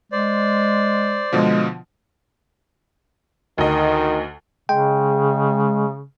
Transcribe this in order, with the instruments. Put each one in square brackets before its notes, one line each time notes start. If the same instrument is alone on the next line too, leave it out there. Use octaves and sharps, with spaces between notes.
[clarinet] G#3 [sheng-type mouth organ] C5 D5
[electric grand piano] B2 D3 F3 [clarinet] G#3
[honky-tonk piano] D2 D#5 [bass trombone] D#3
[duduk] C#3 [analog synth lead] G#3 [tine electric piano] G5